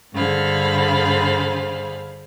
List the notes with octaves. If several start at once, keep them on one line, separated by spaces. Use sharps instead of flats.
G2 D3 G#4 C5 F5 B5